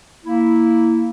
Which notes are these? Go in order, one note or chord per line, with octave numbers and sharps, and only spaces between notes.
A#3 E4